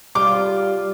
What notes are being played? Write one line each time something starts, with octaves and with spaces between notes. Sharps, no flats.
G3 F4 D6